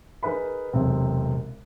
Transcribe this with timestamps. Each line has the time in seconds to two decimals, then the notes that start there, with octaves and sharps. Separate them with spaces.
0.23 D#4 G#4 A#4 B4 G#5 B5
0.73 E1 B1 C3 C4